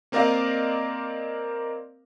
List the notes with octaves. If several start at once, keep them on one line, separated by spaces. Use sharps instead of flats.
A#3 C4 A#4 D5 D#5 F5